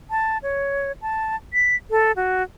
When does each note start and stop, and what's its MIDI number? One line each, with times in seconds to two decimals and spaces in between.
0.10 0.38 81
0.43 0.92 73
1.02 1.36 81
1.54 1.76 95
1.90 2.12 69
2.16 2.43 66